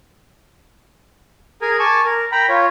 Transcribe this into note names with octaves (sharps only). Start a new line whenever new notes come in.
G#4 A#4 G#5
G#5 A5 C#6 D6
A#4
G5 A#5 B5
F4 C#5